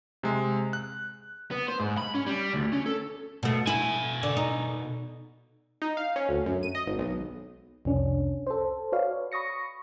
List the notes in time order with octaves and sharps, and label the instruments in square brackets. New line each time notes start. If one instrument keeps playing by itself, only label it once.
[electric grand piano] C3 G#3
F#6
[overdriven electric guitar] B3
C5
G#2
B5
C#4
G3
D2
C#4
A4
[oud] B2 A3
[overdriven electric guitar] B2 G#5 [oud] E4
[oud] D3
D#4
[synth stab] D#4
F5
C#4
D2
F#2
D#7
D#5
G#1
B1
[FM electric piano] C2 F2 C#4 D4
A4 C5
F#4 B4 C#5 D5 F5
B5 C#6 D#6 A#6 C#7